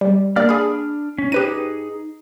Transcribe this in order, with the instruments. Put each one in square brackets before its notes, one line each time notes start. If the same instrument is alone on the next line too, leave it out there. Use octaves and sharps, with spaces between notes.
[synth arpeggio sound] G3
[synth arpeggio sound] A#3 G4 D5 [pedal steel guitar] D4 F6
[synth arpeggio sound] G#4 B5
[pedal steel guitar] C#4
[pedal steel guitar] D#4 G#4 [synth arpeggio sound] G4 B4 D#7